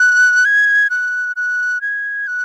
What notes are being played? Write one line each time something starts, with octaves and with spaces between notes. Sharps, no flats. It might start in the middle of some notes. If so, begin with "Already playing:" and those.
Already playing: F#6
G#6
F#6
F#6
G#6
F#6